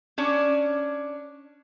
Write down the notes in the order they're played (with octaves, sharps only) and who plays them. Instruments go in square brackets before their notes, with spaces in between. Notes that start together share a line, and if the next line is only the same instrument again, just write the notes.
[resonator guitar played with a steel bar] C#4 D4 C#5